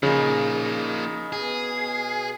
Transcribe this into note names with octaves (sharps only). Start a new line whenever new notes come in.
C#3 F3 A#3 D#4
B2 G#4